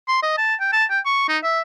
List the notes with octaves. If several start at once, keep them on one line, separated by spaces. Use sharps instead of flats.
C6
D#5
A5
G5
A5
G5
C#6
D#4
E5